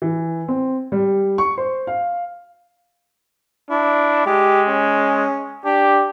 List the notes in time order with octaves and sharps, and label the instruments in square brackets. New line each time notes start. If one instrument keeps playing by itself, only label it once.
[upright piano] E3
C4
G3
C#6
C5
F5
[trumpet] D4 [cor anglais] E4
[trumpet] G#3 [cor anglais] G4
[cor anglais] C#4
[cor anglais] D4 [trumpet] G4